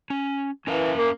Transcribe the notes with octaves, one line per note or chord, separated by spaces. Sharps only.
C#4
E3 C#4 A#4 F5
A#3